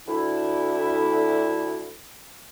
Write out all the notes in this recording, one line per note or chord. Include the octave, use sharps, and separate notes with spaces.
D2 E4